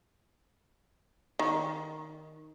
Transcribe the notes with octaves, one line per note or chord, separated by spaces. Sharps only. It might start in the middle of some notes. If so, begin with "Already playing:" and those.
D#3